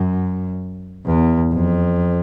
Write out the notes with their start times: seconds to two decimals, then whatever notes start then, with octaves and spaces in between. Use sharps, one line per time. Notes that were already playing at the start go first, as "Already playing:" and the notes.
Already playing: F#2
1.06 E2
1.53 F2